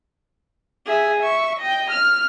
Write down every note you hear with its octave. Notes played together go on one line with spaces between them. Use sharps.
G#4 E5
E5 C#6
D#5 G5
F6